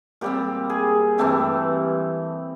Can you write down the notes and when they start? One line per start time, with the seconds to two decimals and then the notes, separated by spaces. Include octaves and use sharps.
0.21 A#2 G3 C4 G4
0.70 G#4
1.18 G2 E3 A3 C4 G4